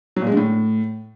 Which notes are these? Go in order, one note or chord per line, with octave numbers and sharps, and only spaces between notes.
F#3
A#2
G#3
D3
A2